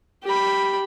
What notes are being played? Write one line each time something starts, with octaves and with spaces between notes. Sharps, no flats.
G4 B5